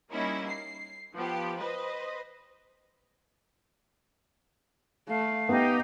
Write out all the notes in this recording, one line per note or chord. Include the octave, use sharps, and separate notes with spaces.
G3 A#3 C#4 D#4 E4
C7
F3 B3 G4
B4 C5 D#5
A3 F5
B3 D#4 G4